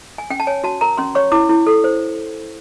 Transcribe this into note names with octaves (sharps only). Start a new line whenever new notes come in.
G#5
C#4 G5
A5
C#5 G#5
F#4 A5
A#4 A#5
C#4 C6
C#5 C#6
E4 D6
E4
A4
C5